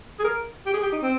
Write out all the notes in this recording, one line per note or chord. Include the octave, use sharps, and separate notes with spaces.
G#4
A#4
G4
G#4
G4
D#4
C4